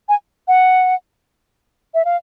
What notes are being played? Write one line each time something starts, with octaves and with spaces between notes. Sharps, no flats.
G#5
F#5
E5
F5